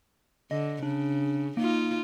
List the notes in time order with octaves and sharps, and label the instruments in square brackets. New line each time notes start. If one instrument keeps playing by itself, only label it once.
[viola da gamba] D3 [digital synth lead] D#5
[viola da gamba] C#3 [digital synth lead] D4
[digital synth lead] A#3 [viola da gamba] D#4 F4